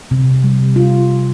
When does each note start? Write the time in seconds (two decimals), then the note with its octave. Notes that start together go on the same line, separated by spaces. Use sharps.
0.11 C3
0.44 G3
0.76 F4